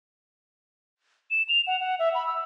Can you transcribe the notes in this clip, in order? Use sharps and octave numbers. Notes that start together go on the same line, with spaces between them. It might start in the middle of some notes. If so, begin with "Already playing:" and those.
E7
F7
F#5
F#5
E5
B5
E6